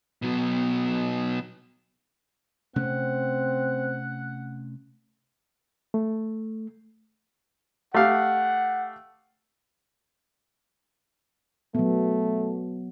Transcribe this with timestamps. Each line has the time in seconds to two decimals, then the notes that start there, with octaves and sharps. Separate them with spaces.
0.22 B2 F#3
2.76 C3 A3 C4 C#4 F#5
5.94 A3
7.94 A3 G4 F5 F#5
11.75 F#3 A3 B3